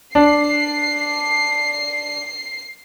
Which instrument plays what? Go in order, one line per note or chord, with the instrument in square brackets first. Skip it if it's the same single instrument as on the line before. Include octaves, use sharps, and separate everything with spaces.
[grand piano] D4 [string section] C7